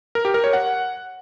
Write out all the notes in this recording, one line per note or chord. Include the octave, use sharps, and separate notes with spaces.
A#4
G4
A#4
C#5
F#5